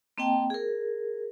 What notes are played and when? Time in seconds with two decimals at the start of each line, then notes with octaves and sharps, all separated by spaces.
0.18 A#3 C4 D#5 G5 A5
0.50 G#4 A#4